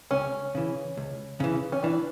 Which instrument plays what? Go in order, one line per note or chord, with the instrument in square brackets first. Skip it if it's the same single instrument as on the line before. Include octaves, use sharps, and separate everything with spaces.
[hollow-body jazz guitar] C#2 [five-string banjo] C#4
[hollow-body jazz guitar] C#3 E3
C#2
C#3 E3
[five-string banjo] C#4
[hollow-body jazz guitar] E3 [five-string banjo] D4